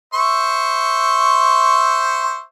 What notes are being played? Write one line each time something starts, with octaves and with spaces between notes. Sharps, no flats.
C5 E5 C#6